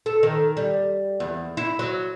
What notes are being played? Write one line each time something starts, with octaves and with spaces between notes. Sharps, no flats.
A4
D#3
G3
E2
E4
F#3